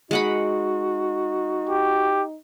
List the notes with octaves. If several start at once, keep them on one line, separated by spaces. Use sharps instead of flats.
G#3 D#4 F#4 F#5 B5
G4